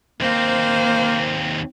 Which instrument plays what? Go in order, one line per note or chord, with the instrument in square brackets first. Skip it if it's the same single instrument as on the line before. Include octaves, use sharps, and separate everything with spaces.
[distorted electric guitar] D#2 C4 [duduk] A#3 [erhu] C5